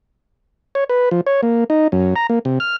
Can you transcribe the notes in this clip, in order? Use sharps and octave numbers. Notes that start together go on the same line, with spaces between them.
C#5
B4
F3
C#5
A#3
D#4
F#2
A#5
A#3
C3
F6